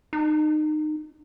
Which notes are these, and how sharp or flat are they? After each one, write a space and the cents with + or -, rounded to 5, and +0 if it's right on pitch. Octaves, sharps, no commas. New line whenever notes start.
D#4 -25